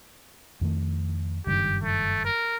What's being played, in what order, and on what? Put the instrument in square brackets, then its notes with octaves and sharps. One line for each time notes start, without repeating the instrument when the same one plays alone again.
[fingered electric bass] F2 D#3 A3
[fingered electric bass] F#1 G2 D#3 [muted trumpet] G4
[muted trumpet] A3
A#4